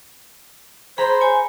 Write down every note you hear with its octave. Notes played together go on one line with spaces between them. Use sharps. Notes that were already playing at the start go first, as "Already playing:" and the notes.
G#4 C5 A#5 B5
C#5 G#5